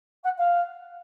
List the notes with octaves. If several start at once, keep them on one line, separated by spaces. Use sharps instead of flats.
F#5
F5